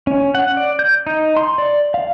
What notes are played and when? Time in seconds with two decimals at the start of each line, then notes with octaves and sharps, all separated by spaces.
0.07 C#4
0.35 F#5
0.57 D5
0.79 G6
1.07 D#4
1.37 C6
1.58 D5
1.94 F5